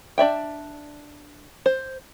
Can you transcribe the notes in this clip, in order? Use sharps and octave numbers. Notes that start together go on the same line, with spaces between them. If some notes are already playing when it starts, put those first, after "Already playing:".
D4 D5 E5 G5
C5